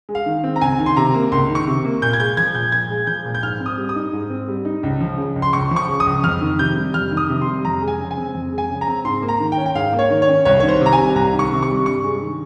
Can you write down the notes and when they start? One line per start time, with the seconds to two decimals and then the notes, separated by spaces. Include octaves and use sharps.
0.09 G#3
0.15 F5
0.26 D#3
0.44 C4
0.56 A#5
0.61 C#2 G#5
0.79 D#3
0.86 C6
0.96 C3 A#5
1.14 A#3
1.32 C#2 C6
1.49 D#3
1.55 C#6
1.67 C3
1.85 A#3
2.02 A#2 G6
2.13 G#6
2.19 G#3 G6
2.37 F3 G#6
2.55 A#2 G6
2.72 A#2 G#6
2.90 G#3
3.07 F3 G6
3.25 A#2
3.34 G6
3.43 G#2 F6
3.60 C4
3.66 D#6
3.78 G3
3.89 D#6
3.96 D#4
4.13 G#2
4.30 C4
4.48 G3
4.65 D#4
4.83 C#2
5.01 F3
5.18 C#3
5.36 C#2
5.42 C6
5.53 C#2 C#6
5.71 F3
5.76 C#6
5.88 C#3
6.00 D#6
6.06 C#2
6.23 F2 F6
6.41 D#3
6.59 C3 G6
6.76 G3
6.94 F2 F6
7.11 D#3
7.17 D#6
7.29 C3
7.41 C6
7.47 G3
7.64 F2 A#5
7.82 G#3
7.88 G#5
7.99 C#3
8.11 G#5
8.17 C4
8.35 F2
8.52 G#3
8.58 G#5
8.70 C#3
8.81 A#5
8.87 C4
9.05 G#2 C6
9.22 A#3
9.29 A#5
9.40 D#3
9.52 G5
9.58 C#4
9.66 G5
9.75 G#2 F5
9.93 A#3
9.99 C#5
10.10 D#3
10.22 C#5
10.28 C#4
10.45 C2 C#5
10.60 D#3 C#5
10.69 C5
10.81 C3
10.86 A#5
10.93 G#5
10.98 G3
11.15 C2 A#5
11.33 D#3
11.39 C#6
11.51 C3
11.63 C#6
11.68 G3
11.86 G2 C#6
12.04 G#3
12.21 D#3